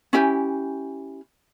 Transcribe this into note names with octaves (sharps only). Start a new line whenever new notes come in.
C#4 E4 G4 G#5